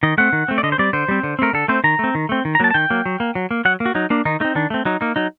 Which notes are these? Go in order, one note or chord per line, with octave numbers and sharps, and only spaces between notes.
D#3 D#5
A3 C4 F#5
D#3
A3 C4
D5
D3 D#5
C5
G3 C4 D5
D3 C5
G3 C4
D3
A3 C4 A#4
D3 A4
A3 C4 C5
D#3 A#5
A3 C4
D#3
A3 C4
D#3
A#5
F#3 A#3 A5
A5
D#3 G5
F#3 A#3
F#3
A#3
F#3
A#3
F#3 F#5
A#3
F#4
F#3 D#4
A#3 D4
D#3 D#4
A3 C4 D#4
D#3 D4
A3 C4
F#3 D#4
A#3 D#4
F#3 D#4